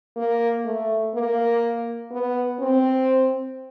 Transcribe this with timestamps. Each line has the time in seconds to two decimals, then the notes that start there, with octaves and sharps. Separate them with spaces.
0.17 A#3
0.66 A3
1.15 A#3
2.12 B3
2.60 C4